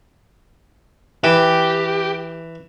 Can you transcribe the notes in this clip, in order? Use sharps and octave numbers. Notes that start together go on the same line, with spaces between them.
E3 G4